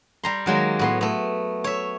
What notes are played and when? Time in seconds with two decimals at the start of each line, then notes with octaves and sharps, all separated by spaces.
0.24 G3 A#5 C6
0.46 D#3 F#3 G#3 A#3
0.79 A2 B3 C6
1.01 A3 B3
1.64 C#5 E5